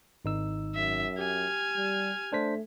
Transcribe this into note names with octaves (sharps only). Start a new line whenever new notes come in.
G#1 D#4 E6
F#2 E5
G4 G#5 F6
G3
A3 D4 C5 B6